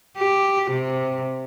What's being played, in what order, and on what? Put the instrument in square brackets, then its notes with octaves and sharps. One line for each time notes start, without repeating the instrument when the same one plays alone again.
[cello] G4
C3